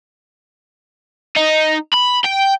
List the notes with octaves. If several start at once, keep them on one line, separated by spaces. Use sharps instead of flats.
D#4
B5
G5